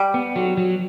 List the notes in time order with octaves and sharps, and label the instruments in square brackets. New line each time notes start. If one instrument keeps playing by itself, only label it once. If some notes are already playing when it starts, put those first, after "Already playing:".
Already playing: [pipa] G3
[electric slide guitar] B3
F#3
F#3